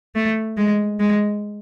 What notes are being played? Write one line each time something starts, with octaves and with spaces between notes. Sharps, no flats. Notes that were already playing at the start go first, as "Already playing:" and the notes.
A3
G#3
G#3